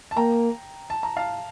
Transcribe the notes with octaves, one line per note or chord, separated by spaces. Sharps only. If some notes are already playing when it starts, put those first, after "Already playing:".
A5
A#3 G5 A#5
A5
A#5
F5 A5